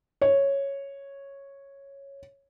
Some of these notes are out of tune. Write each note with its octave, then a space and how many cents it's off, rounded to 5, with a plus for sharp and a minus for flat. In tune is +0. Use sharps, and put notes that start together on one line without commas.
C#5 -5